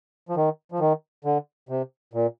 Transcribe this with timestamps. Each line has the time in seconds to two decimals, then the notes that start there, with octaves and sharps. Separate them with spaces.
0.29 F3
0.36 D#3
0.72 F3
0.80 D#3
1.25 D3
1.69 C3
2.14 A#2